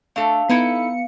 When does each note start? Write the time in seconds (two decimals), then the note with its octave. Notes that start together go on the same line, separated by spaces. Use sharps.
0.16 A3 D4 A4 F5
0.49 B3 D#4 E4 A4 C#7